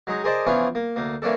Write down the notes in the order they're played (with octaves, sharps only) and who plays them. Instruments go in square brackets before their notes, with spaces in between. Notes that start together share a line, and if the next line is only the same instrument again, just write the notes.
[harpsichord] F#3 G#3 D#4
G#4 A#4 C5 D5 D#5 A5
E3 F3 B3 C#4 D4 F4
A#3
D2 A#3
E3 A#3 C#4 D4 A4